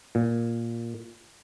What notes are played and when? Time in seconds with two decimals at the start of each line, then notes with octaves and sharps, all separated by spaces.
0.15 A#2